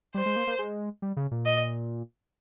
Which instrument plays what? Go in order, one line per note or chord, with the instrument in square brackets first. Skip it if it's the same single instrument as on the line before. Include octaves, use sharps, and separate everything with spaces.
[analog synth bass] G3 [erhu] C5
[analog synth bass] G#3
A#3
A#3
G#3
G3
C#3
A#2
[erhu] D#5